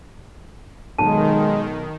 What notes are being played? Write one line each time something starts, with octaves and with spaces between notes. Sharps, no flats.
B1 D#3 G#3 A5